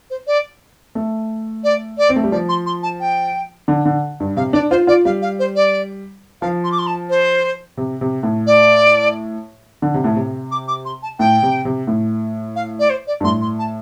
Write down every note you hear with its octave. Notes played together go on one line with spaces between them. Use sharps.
C5
D5
A3
D5
D5
C4
A3
G3
F3 D5
C6
C6
A5
G5
D3
D3
G2
C3 F5
D4 D5
F4 C5
F4 D5
G3 F5
F5
C5
D5
F3 F5
C6
D6
C6
A5
C5
C3
C3
A2
D5
D3
C3
A2
C3
D6
D6
C6
A5
A2 G5
C3
C3
A2
F5
D5
C5
D5
G2
A2 C6
C6
A5